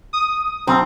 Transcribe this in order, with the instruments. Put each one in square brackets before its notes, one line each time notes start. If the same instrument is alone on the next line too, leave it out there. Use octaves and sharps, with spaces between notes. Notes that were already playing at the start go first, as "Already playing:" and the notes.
[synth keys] D#6
[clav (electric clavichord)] B1 [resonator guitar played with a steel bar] C4 [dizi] A#5